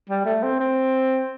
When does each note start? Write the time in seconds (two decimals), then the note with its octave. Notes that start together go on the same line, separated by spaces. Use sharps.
0.09 G3
0.25 A3
0.43 C4
0.60 C4